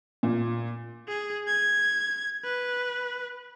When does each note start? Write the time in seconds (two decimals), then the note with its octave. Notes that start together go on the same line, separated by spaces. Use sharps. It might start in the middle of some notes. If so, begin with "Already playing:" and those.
0.23 A#2
1.08 G#4
1.48 G#6
2.44 B4